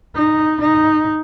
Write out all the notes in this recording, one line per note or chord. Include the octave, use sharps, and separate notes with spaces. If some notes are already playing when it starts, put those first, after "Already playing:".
D#4
D#4